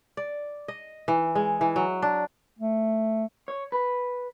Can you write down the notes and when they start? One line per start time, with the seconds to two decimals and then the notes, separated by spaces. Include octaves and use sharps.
0.17 D5
0.68 D#5
1.08 E3
1.35 G#3
1.61 E3
1.76 F#3
2.02 D4
2.59 A3
3.48 C#5
3.72 B4